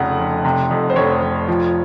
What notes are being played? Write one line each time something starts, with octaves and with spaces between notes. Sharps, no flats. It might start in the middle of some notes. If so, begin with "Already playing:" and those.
Already playing: F1 F2 C#3 F#5
F1
C3
F2
C5
F1 C#5
F1
F3